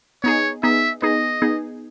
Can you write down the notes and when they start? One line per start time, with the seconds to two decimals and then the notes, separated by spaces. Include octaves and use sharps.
0.23 B3 D#4 G#4 C#5
0.63 B3 D#4 G#4 E5
1.02 B3 D#4 G#4 D#5
1.42 B3 D#4 G#4